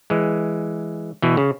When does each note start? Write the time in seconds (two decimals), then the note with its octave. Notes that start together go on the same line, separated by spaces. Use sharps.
0.10 E3 G#3
1.22 B2 E3
1.37 C#3